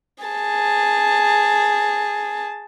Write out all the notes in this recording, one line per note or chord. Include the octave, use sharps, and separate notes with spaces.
G#4 A5